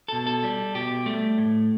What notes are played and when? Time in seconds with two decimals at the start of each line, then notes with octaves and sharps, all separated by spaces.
0.08 A4
0.13 B2
0.27 A4
0.43 G3
0.75 B2 G4
1.06 G3 A3
1.38 A2